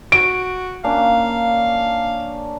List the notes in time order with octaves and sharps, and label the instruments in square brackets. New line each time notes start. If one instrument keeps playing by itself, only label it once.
[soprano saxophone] F#4 [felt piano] D7
[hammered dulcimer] A#3 C#4 D4 [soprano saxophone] F5